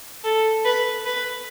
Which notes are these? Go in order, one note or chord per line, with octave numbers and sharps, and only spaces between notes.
A4
B4
B4